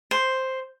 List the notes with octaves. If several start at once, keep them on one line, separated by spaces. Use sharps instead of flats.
C5